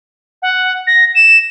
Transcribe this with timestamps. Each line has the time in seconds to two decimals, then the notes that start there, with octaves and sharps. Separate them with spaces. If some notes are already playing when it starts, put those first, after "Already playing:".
0.42 F#5
0.87 A#6
1.15 E7